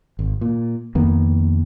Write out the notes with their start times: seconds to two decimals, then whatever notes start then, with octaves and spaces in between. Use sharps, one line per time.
0.19 G#1
0.41 A#2
0.95 F2 D#3 A#3 B3